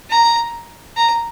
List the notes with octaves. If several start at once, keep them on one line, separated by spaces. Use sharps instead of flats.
A#5
A#5